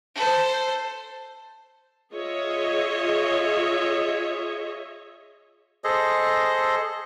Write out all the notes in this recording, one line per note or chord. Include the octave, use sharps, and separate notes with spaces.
A4 C5
F4 G#4 C#5 D#5 E5
G#4 A4 C5 D#5